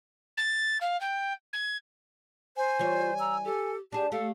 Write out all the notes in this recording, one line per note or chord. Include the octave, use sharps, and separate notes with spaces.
A6
F5
G5
G#6
C5 G#5
E3 G3 F4 C#5
A#5 E6
G4 A4
D4 G4 G#4 A5
A3 G4 A4 F5